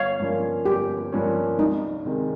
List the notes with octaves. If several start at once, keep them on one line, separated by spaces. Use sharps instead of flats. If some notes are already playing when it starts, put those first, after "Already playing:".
Already playing: G1 C#5 F5
G2 F3 A#3 C#4
G1 G4
G2 F3 A#3 C#4
C2 D#4
C3 D#3 G#3